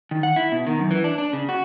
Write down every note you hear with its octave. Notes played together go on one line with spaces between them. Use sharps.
D#3
F#5
E4
B2
D#3
F#2
E3
D4
D4
C#3
F#4